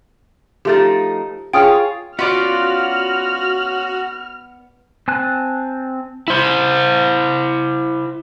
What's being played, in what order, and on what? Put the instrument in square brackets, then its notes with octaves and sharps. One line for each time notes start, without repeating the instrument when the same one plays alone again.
[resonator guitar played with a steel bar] F3 A3 D#4 [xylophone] G4 A6
[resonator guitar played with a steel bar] F4 G#4 C#5 [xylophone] G5 D#6 F6
[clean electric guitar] B3 D5 [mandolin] C#4 F4 [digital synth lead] F#4 [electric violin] F6
[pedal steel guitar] C4 G#5 A5 F#6
[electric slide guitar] E4 C5